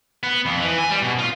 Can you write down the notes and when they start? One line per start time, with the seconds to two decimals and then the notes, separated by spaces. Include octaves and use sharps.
0.23 B3
0.46 F2
0.61 E3
0.79 G#5
0.91 G3
1.03 B2
1.19 F4